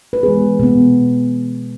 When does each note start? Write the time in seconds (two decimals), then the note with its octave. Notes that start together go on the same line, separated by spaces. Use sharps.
0.13 B4
0.23 E3 G#3 B3 G#4
0.59 B2 B3